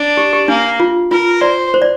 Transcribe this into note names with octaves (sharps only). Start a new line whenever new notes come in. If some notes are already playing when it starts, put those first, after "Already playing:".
Already playing: D4
G4
G4
A#3 D4
F4
F4 A#4
C5 D5
C5
D5